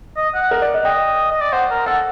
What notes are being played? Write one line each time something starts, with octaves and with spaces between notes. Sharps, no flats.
D#5
F#5
A#4
D5
D#5
D#5 G5
D#5
D5
C5 F#5
A#4
A4 F#5